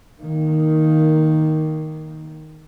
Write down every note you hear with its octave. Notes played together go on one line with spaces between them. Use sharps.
D#3 A#3